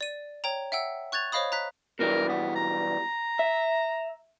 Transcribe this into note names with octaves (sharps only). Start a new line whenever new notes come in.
D5 D#7
C#5 G5 A#5
E5 F#5 G5 E6
C#6 F#6 G#6 A6 F7
C5 C#5 D#5 F5 B5 D#6
A#5 F#6 B6
B2 E3 G3 A#4
B3
A#5
E5